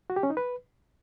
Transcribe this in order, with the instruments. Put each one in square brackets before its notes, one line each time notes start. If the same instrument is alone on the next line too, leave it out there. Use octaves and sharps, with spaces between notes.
[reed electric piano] F#4
G4
C#4
D#4
B4